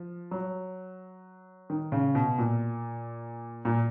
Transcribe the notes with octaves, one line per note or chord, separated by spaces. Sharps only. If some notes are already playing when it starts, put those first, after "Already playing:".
Already playing: F3
F#3
D#3
C#3
B2
A#2
A#2